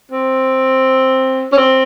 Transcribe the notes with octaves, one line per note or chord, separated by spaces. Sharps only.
C4
C#4
C4